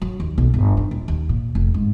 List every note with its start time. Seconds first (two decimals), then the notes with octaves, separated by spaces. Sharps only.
0.02 F#3
0.20 D#2
0.38 B1
0.54 G1
0.77 D#3
0.91 D#1
1.08 D#2
1.29 A#2
1.55 F1
1.74 G#2